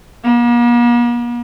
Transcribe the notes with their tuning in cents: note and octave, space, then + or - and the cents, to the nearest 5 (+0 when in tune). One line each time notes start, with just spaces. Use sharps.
A#3 +45